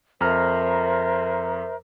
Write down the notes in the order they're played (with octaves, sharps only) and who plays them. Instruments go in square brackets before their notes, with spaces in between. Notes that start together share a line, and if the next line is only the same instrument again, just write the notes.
[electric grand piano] F2 A#5 F6 [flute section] A#4 C5 E5